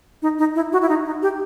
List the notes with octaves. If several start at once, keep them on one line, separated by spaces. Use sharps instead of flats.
D#4
D#4
E4
F#4
E4
D#4
D#4
G4